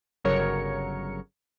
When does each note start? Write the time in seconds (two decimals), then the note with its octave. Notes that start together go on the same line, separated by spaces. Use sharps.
0.24 G1 C#3 F#3 A#4 C#5 C#7